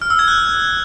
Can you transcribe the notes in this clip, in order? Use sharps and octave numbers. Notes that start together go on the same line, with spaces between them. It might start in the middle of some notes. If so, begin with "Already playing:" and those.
F6
E6
G#6
F#6